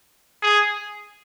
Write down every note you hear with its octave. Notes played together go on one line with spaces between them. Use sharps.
G#4